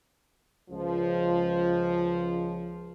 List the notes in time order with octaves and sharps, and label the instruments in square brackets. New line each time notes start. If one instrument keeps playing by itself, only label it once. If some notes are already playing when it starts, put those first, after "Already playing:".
[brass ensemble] C#2 F3